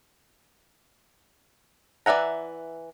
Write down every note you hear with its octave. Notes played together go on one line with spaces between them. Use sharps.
E3 D5 E5 F#5 A#5